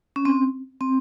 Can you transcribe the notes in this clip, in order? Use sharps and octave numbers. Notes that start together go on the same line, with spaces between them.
C#4
C4
C4